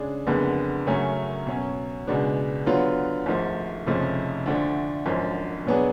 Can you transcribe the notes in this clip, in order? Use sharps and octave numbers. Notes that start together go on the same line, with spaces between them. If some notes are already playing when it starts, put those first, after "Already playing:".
Already playing: C#3 G#3 D4 G#4
F#1 F2 D3 G#3 B3
F#2 C#3 F#3 A3 C#4
B2 F#3 C#4
C#2 B2 G#3 B3 D4
D3 F#3 B3 F4
G#1 G#2 F3 A3
F1 F2 C#3 F3 A3
D2 D3 F3 A3 D4
G#1 F#2 D3 F3
B2 F#3 B3 D4 G#4